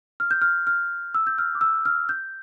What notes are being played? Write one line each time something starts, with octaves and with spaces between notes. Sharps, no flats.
F6
G6
F6
F6
E6
G6
F6
D6
E6
F6
G6